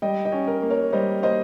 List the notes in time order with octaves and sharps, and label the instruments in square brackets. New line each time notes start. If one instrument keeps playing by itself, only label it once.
[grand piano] G3 [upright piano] D#5 G5
[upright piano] D#5 G5
[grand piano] C#4
[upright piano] A#4
[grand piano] A#3
[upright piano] A#4 C#5
[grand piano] G3 [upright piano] C5 D#5
[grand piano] A#3 [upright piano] C5 D#5